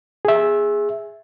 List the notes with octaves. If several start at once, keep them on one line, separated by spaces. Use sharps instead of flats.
G#4 E5